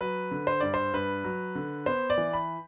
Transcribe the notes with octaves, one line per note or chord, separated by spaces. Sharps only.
F#3 B4
D3
C5
G2 D5
C5
G2 B4
F#3
D3
B3 C5
D5
E3
B5